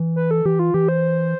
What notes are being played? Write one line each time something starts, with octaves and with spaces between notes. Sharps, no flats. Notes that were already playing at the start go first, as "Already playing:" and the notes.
Already playing: E3
B4
A4
E3 G4
F4
E3 G4
C5